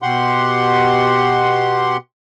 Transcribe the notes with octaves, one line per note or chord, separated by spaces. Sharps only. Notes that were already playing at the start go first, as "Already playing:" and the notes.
B2 G4 F#5 C6